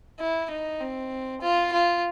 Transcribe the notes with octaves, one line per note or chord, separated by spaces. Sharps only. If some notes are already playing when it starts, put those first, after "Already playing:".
E4
D#4
C4
F4
F4